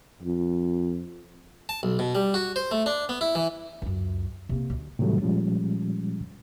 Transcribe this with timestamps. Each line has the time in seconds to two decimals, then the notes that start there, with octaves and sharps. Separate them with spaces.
0.23 F2
1.69 A5
1.83 B1
1.99 B2
2.15 G3
2.34 F#4
2.56 C5
2.71 A3
2.86 D4
3.09 B3
3.21 E4
3.35 E3
3.82 C#2 F#2
4.49 C3 A#3
4.70 D2
4.99 A2 C3 D#3 F#3 G3 A3
5.22 A#2 F3 G3 G#3 C#4